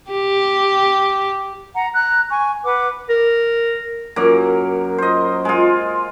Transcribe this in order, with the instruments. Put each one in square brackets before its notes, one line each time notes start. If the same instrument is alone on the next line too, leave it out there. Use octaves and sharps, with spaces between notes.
[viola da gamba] G4
[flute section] F#5 A#5
A#5 F#6
G#5 C#6
B4 F#5 D6
[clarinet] A#4
[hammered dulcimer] F#2 F#3 A#3 A#4
C5 D#5
G#3 F4